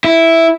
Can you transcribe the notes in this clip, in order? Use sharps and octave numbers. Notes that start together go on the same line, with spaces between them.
E4